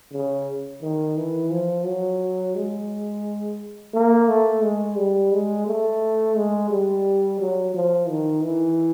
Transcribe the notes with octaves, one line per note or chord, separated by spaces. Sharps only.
C#3
D#3
E3
F3
F#3
G#3
A#3
A3
G#3
G3
G#3
A3
G#3
G3
F#3
F3
D#3
E3